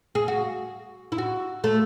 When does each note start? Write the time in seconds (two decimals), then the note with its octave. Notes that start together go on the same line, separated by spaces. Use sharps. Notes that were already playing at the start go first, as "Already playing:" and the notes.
0.15 G#4
0.28 F#4
1.12 E4
1.18 F#4
1.64 A3